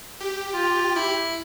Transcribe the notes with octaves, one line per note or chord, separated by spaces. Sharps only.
G4
F4
E4